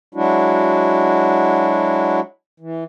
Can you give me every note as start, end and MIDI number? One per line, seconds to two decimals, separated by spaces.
0.15 2.20 54
0.15 2.20 56
0.15 2.20 62
0.15 2.20 64
0.15 2.20 66
2.60 2.84 52